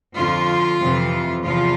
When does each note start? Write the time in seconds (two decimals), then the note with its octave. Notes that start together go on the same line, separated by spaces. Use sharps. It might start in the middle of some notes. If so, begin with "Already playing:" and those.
0.15 F2 D3 F3 F4
0.79 F2 C3 E3
1.43 E2 C3 F3 F4